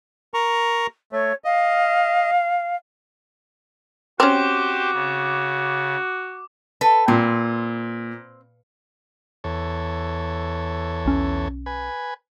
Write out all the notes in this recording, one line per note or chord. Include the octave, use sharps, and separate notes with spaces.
A#4 A#5 C#6
A3 C#5
D#5 F5
C4 C#4 F#4 G4 C5 D6
C#3
A4 B4
A#2 C4
E2 A4 C#5
B1 C#4
B4 G#5